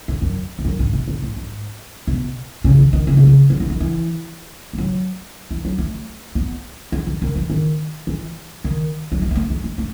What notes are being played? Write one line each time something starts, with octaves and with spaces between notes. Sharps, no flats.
A2
F#2
E2
F#2
G#2
B2
B2
A2
G#2
B2
C#3
D#3
D#3
C#3
B2
C#3
F#3
E3
D#3
E3
G#3
F#3
E3
F#3
A3
B3
A3
E3
D#3
E3
D#3
E3
D#3
F#3
G#3
B3
A3
G#3
A3
A3